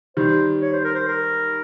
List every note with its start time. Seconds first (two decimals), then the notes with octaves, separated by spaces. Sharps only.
0.17 D#3 G3 C5
0.62 C#5
0.73 C5
0.84 A#4
0.95 C5
1.08 A#4